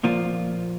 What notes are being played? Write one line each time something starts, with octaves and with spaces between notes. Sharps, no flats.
A#2 F3 A#3 F4